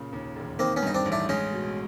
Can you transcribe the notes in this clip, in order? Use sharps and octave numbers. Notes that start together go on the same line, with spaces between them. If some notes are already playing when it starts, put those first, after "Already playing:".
Already playing: A#2 C#3
D#2
E1
D#3 A#3 C4
B3 C#4
G2 D#4
C4 D4
A1
D4 E4
G#3 C#4 D#4
B2